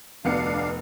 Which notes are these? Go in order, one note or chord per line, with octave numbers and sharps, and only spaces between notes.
F1 D2 B3 D4 F5 C#7